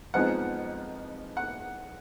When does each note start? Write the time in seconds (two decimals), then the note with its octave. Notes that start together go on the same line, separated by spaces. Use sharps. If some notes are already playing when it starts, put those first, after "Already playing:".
0.14 F2 F3 G#3 B3 D#4 F#5
1.37 F#5